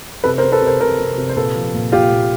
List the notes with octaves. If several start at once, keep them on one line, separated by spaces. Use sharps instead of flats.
C3 A4 B4
A#4 C5
C3
A4 B4
C3
A#4 C5
C3 A#4 C5
C3
C3
C5
A#2 A4 B4
F3
A#2
A#2 F4 G4
A#2